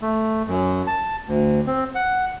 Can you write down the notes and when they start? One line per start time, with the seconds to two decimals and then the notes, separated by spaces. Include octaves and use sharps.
0.02 A3
0.47 F#2
0.87 A5
1.28 D2
1.67 C4
1.95 F#5